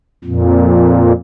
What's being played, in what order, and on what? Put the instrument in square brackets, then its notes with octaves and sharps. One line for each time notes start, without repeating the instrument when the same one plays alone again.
[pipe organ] F2 A#2